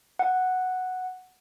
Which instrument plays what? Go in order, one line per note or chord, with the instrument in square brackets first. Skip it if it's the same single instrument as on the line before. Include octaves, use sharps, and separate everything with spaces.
[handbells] F#5